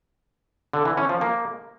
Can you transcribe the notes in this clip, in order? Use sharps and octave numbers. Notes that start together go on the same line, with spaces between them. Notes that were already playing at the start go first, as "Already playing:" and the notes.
D3
E3
C#4
F3
A#3